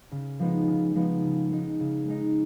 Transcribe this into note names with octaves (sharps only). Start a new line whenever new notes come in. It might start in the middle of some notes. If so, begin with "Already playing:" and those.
C#3
F3 G#3 B3 D#4
C#3
F3 G#3 B3 D#4
C#3
G#3 D#4
C#3
G#3 D#4